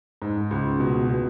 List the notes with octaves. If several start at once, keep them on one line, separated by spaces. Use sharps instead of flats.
G#2
C#2
B2
B2